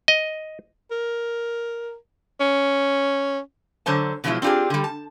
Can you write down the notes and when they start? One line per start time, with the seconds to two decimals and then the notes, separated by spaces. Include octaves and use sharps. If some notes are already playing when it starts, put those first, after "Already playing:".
0.08 D#5
0.91 A#4
2.40 C#4
3.86 D3 F#3 C5 C#5 A5
4.24 B2 D3 F3 F#3 G#3 E4
4.42 C4 D4 F4 G4 G#4
4.70 D3 G3
4.84 A5